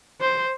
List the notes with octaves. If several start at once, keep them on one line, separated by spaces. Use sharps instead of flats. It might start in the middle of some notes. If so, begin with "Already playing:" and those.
C5